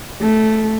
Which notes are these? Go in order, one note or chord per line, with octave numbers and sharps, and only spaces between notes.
A3